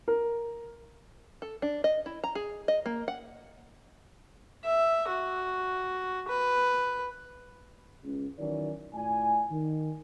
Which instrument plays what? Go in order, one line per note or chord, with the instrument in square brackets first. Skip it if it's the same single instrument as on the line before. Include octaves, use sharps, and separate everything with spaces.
[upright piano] A#4
[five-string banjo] A4
D4
D#5
E4
A#5
G#4
D#5
A#3
F#5
[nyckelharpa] E5
F#4
B4
[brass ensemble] C#2
D#3 E3 F#3 C#4 A#4 D5
A2 F4 D5 G#5
D#3